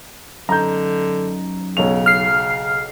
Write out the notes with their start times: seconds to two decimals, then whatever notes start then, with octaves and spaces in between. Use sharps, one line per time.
0.49 F#2 D3 D#4 A#5 G6
1.77 B1 C#3 C#5 F7
2.06 F6 C7